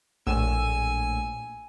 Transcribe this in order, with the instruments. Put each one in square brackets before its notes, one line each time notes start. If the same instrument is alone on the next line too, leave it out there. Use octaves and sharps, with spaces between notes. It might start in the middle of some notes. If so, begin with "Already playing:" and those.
[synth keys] A#1 A2 E6 [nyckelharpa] G#5